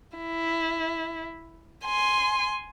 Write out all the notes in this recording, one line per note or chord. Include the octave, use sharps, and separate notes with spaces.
E4
G#5 C6